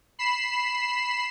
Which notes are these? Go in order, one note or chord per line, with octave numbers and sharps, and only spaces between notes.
B5 C7 E7